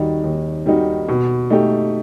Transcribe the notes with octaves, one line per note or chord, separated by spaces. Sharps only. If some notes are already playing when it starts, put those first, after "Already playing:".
Already playing: D#2 D#3 G3 D#4 F#4
D#2
D#3 G3 D#4 F#4
B2
A3 D#4 G4